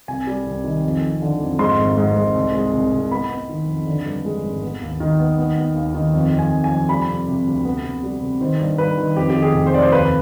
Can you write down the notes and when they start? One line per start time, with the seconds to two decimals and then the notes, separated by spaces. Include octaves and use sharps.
0.08 C2 G#5
0.27 G3
0.46 C2
0.64 D#3
0.84 F2
1.03 F2
1.22 D3
1.41 F2
1.59 G#2 C6
1.79 G#1
1.98 G#2
2.16 G#2
2.35 C2
2.54 G#3
2.73 C2
2.92 C2
3.11 B3 B5
3.30 B3
3.49 D#3
3.68 F2
3.87 D3
4.05 G2
4.25 G#3
4.44 G#1
4.62 B3
4.81 D#2
5.00 D#3
5.20 B3
5.38 B3
5.57 B3
5.75 D#2
5.95 D#3
6.14 F2
6.33 F2
6.39 G#5
6.52 F2
6.64 G#5
6.71 F2
6.89 G3 B5
7.08 C3
7.28 C3
7.47 D2
7.65 B3
7.83 C3
8.03 G3
8.22 C3
8.41 D#3 C5
8.59 G2
8.78 G2 B4
8.98 D#3
9.16 F2 G4
9.30 G4
9.35 D#3
9.42 G#4
9.54 F1
9.66 C5
9.73 F2 D5
9.82 C5
9.92 D#2 B4